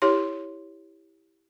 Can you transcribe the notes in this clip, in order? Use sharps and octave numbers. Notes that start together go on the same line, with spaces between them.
E4 G4 C#5 C6